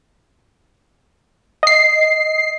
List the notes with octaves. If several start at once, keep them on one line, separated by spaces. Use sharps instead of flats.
D#5 C7